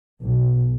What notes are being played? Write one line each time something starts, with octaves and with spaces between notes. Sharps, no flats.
B1